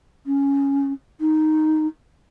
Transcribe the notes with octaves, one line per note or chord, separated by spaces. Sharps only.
C#4
D#4